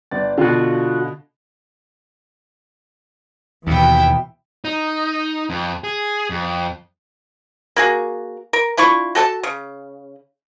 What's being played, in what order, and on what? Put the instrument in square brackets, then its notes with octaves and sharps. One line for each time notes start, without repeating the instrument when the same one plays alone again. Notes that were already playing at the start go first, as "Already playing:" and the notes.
[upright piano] G1 D5 A6
[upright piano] B2 D3 [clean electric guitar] F4 F#4
[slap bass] D#2 [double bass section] B2 E3 [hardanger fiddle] E4 G5
[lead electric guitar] D#4
F2
G#4
F2
[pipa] A#3 F#4 G#4
A#4
D4 E4 F4 C#6
F#4 A4 G#5 A5
C#3